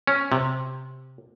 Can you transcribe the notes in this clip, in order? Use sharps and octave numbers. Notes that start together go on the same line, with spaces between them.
C#4
C3